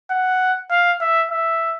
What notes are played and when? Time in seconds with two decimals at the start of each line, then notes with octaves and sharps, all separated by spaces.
0.10 F#5
0.71 F5
1.01 E5
1.31 E5